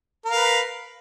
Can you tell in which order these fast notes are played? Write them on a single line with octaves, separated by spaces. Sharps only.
A#4 F5 B4